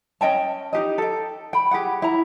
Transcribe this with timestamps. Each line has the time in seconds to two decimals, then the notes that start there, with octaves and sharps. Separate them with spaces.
0.21 C#4 D#5 G5 A5
0.73 D#4 G4 D#5
0.98 A4 G5
1.53 G5 B5
1.71 G4 G#4 F#5
2.02 E4 A#5